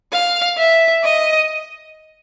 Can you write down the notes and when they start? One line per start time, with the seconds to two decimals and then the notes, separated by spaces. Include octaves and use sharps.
0.12 F5
0.57 E5
1.03 D#5